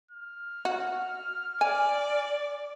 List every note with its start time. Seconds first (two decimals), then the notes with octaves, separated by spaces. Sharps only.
0.11 F6
0.65 F#4
1.61 D5 G#5